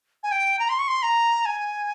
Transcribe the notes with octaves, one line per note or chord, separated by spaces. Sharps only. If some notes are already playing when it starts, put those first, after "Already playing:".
G#5
G5
A#5
C6
C#6
C6
A#5
G#5